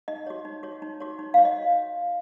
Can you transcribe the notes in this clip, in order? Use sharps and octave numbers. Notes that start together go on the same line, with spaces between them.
D#4 D#5
F#4 C#5
D#4
F#4 C#5
D#4
F#4 C#5
D#4
F#4 C#5 F5
D#5